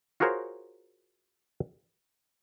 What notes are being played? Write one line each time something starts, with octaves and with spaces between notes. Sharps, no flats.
F4 F#4 G#4 A#4 C5 C#5